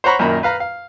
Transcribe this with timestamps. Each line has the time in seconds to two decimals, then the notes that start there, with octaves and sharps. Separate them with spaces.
0.04 C5 C#5 F#5 A#5 B5 C#6
0.19 F#2 A#2 D#3 A#5 B5
0.43 B4 F5 A#5
0.60 F5